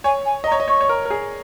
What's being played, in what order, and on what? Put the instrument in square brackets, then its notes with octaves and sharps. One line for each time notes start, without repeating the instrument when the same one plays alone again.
[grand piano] C#5 [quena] G#5
[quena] G#5
[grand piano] D#5
[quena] A#5
[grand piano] C#5
D#5
[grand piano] C#5 [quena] C#6
[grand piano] C#5
A#4
A#4
G#4